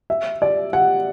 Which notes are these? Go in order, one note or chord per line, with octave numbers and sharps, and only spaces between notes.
E5
D5
F#5